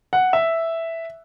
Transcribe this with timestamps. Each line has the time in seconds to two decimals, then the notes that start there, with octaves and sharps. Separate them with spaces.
0.13 F#5
0.33 E5